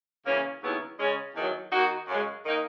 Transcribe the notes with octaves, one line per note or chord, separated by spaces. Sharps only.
C#3 E3 A#3 C#4
D#2 C#3 F#3 B3 E4
C#3 G#3 C#4
E2 D#3 F#3
D#3 A#3 D#4 F#4
F#2 C#3 G#3
D#3 A#3 D#4